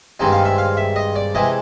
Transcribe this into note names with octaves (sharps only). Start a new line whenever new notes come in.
G2 D#3 G#3 C4 D#4
F5
E5
F5
E5
D#5
D5
C3 E3 G#3 D#5